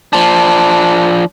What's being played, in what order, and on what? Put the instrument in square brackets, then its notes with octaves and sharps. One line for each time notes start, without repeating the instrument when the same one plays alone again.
[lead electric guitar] F3 D4